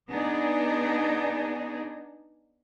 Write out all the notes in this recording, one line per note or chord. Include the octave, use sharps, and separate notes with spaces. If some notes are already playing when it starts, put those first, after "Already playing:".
B3 D4 D#4 G#4